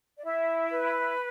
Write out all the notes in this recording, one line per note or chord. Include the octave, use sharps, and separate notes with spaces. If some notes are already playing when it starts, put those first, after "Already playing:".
D5
E4 E5
B4